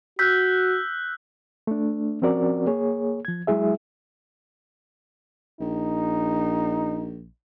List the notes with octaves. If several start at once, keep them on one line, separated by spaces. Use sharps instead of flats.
F#4 E6 F#6 G6 B6
A3 D4
F3 C4 C#4 F#4 A#4 D5
A#3 G#4 C#5
F3 G#6
F#3 G#3 E4 G#4 E5
A#1 D#4